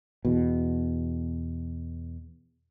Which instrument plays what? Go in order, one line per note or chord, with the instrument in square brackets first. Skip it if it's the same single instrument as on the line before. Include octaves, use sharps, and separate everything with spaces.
[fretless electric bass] E2 B2